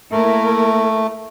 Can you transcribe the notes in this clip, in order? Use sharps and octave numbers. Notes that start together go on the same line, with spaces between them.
A3 A#3 E4 A#4